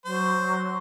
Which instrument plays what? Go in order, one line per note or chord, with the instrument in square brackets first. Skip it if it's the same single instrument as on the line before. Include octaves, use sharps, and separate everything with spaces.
[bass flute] F#3 [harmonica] C5